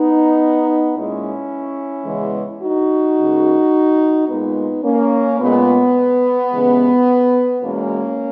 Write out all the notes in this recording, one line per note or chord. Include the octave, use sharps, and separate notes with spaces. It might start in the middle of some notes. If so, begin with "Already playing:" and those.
Already playing: B3 D#4
A#2 G#3 C#4 E4
E2 C#3 E3 G#3
D#4 F#4
F#2 C#3 G#3
A#2 G#3 B3 D#4
A#3 C#4
A#2 G#3 B3
D#2 C#3 E3 G#3
E2 B2 G#3 A#3 C#4